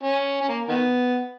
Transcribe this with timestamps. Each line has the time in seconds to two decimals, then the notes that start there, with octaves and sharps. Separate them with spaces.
0.03 C#4
0.41 C#4
0.49 A#3
0.68 D#3 B3